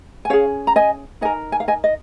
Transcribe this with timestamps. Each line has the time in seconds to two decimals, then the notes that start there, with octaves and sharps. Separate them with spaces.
0.25 G#5
0.30 C#4 G#4 C#5 F5
0.67 A#5
0.76 D#5 G#5
1.21 D#4 A#4 D#5 G#5
1.52 G#5
1.60 F5
1.68 D#5 G#5
1.84 D#5